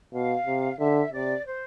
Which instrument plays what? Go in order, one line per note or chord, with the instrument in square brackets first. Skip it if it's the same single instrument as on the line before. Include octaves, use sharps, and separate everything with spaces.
[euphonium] B2 [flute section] F5
[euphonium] C3
[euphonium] D3 [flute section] E5
[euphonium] C3 [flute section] D5
[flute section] C5